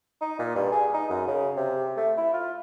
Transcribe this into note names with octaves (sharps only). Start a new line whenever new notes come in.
D#4
A#2
G2
G#4
D#4
F#2
C#3
C3
A3
E4
F4